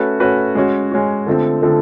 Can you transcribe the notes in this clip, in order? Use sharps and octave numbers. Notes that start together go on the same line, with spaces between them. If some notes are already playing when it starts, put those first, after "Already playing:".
Already playing: A3 C#4 F#4 B4
A3 C#4 F#4 B4
G#3 C#4 F#4
G#3 C#4 F#4
D3 F3 A3 C4
D3 F3 A3 C4